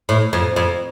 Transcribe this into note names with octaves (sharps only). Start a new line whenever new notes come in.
A2
F2
F2